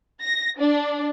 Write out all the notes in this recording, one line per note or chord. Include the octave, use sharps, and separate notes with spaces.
A#6
D4